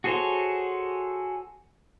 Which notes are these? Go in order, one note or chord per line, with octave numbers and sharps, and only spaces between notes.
F#4 G#4 A4 C5 C#5